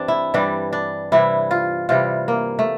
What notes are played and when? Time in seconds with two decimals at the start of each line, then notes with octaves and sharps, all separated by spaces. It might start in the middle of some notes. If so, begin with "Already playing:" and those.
Already playing: G2 E3 G3 C4 D4
0.08 E4
0.34 G2 E3 G3 D4
0.73 D4
1.12 C3 E3 G3 E4
1.51 F4
1.89 C3 E3 G3 F4
2.28 A#3
2.59 A3